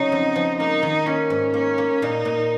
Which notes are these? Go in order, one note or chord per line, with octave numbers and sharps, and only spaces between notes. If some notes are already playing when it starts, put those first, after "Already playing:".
Already playing: C#3 F#3 D#4
F2
F3
A#3 D#4
D#3
A#3 C#4
G#2
A#3 C#4
A#3
A#2 D#4
A#2